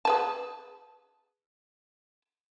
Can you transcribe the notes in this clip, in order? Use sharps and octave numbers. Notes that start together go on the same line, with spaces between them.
G#4 B4 A5